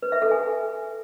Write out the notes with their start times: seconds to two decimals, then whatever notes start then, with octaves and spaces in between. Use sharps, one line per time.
0.02 B4
0.12 E5
0.22 A4
0.31 G#5